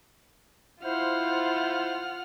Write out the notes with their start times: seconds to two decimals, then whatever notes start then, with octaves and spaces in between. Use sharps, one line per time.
0.84 E4 F4 C5 F#5 F6